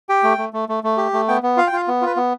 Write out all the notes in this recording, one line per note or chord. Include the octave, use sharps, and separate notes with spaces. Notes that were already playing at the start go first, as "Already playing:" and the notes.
G4 G5
A3
A3
A3
A3
A3
G4
A3
B3 G5
B3
F4 F5
G5
F4 F5
B3
F4 B4
B3